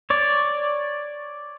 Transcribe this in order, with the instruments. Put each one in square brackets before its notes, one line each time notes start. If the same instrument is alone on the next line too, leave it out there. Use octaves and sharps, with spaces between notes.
[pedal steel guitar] C#5 D5